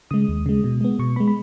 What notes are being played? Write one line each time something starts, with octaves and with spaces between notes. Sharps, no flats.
C#3 G#3 D#6
D#2
C#3 G#3
B2
G#3 B3
B2 C#6
G#3 B3 B5
B5